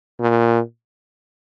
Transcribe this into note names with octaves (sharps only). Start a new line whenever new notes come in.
A#2